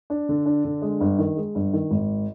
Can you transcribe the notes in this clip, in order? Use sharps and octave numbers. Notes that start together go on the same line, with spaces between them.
D4
D3
D4
D3
G#3
G1
D#3
G#3
G1
D#3
G#1